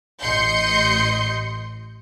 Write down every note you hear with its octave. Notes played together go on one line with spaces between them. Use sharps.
A1 D#5 C6 G6 C#7